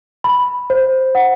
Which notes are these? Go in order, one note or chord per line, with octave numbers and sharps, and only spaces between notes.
B5
C5
F#5